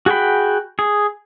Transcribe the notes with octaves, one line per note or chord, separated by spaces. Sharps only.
F#4 G#4 F#5 G5 B5
G#4